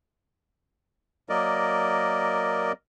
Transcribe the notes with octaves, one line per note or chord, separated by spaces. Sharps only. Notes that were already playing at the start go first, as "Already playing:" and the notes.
F#3 A#3 A#4 D5 D#5